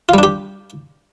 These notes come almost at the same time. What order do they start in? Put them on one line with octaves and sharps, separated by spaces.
F4 G3 D4 G4